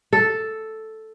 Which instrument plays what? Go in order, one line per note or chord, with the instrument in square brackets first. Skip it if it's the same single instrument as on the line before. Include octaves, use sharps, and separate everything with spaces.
[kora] A4